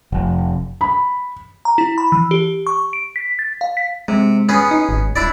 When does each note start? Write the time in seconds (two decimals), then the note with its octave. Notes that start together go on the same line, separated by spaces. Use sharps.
0.12 F1
0.81 B5
1.65 A#5
1.78 E4
1.98 B5
2.12 E3
2.31 G4
2.67 C#6
2.93 D7
3.16 B6
3.39 A6
3.61 F5
3.77 B6
4.08 C3 G#3
4.49 B3 C#4 G#4
4.71 D#4
4.89 G#1
5.16 D#1 D4 E4 D5